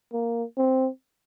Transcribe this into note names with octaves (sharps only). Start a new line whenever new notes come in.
A#3
C4